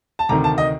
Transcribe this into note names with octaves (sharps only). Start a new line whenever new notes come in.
A5
D2 C3 D#3 A#5
A5
D#5